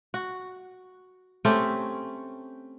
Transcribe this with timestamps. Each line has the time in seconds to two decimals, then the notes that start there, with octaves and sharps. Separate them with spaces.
0.14 F#4
1.45 A3 C4 C#4 G4